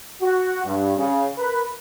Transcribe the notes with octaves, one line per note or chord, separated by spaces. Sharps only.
F#4
G2
C#3
A#4 B4